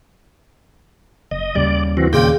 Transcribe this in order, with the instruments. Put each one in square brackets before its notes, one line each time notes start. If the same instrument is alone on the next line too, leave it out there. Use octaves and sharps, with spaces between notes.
[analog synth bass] F#1 [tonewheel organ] D#5
[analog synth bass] D#2 [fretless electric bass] C#3 G3 [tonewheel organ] D5
[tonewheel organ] E3 C4 F#4
[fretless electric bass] D#2 A#2 [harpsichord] C#3 D4 F4 [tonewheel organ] G5